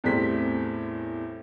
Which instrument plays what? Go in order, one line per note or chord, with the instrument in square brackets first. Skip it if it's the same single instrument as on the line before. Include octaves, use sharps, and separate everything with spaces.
[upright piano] E2 A2 G3 C4 B6